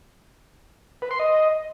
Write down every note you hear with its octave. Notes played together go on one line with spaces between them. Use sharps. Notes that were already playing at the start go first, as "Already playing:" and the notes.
B4
C6
D#5